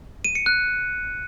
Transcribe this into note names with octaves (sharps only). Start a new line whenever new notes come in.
D#7
C#7
F#6